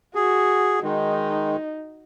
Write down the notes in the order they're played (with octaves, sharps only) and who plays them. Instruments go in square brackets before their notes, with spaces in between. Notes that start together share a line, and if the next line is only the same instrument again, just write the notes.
[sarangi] F#4 [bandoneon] G#4
[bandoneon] D#3 G#3 [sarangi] D#4